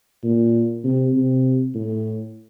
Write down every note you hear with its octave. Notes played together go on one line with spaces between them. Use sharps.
A#2
C3
C3
A2